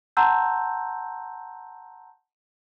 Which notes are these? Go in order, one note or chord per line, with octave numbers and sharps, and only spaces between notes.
F#5 A5 A#5 C6 E6 G6